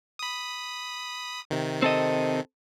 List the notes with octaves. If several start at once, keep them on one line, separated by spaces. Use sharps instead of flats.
B5 D#6
C3 D#3
C4 A4 D#5